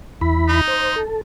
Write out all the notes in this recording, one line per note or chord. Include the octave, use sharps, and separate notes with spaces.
E2 E4 B5
D#4
C5
A4